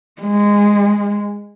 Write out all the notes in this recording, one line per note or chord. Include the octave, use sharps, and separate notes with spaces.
G#3